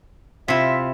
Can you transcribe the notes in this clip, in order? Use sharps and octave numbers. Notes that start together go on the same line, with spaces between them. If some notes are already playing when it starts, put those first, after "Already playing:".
C3 E4 F4 E5